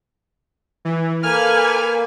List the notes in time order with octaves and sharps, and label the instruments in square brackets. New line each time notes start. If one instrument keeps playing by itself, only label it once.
[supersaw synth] E3
[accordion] A#3 [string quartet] A4 B4 G#5 [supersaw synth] F6